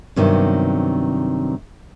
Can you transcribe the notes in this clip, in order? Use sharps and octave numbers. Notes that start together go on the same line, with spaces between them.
G2 C3 D#3 F#3 B3